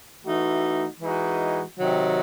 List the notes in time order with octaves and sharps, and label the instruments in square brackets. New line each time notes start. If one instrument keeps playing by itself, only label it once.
[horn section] E3 A3 D#4 F#4
E3 G#3 D#4 F#4
C3 D#3 F#3